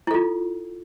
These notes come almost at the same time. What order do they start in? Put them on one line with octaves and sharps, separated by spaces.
E4 A4 F4